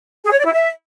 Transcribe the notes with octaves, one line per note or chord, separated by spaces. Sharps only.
G#4
C#5
D5
E4
E5